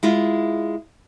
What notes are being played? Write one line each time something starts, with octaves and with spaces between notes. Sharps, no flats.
G#3 E4 F4